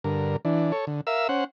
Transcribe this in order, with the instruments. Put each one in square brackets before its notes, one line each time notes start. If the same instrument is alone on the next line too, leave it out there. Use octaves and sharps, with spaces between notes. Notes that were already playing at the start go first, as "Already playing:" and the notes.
[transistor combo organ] G2 D3 A#4
E3 D4
A4 C#5
D3
A#4 E5 F5 E6
C#4 C5 F#5